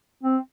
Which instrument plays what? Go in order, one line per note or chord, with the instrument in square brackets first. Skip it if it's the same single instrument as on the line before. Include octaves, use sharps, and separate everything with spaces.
[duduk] C4